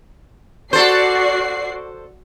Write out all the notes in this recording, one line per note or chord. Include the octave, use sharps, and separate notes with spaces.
F#4 A4 C5 D5 C7